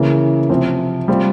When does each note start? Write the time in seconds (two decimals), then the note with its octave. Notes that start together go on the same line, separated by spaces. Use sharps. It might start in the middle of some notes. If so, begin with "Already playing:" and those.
Already playing: C#3 E3 A#3
0.49 C3 F3 C4
1.08 G3 C4 F4